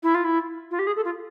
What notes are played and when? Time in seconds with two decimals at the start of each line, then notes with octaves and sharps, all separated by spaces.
0.03 E4
0.14 F4
0.24 E4
0.71 F4
0.79 G4
0.87 G#4
0.96 A4
1.05 F4